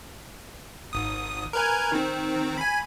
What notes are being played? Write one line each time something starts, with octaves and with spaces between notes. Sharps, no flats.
G#1 D#6
A#4 B4 G#5
D#3 C4
G#5 B5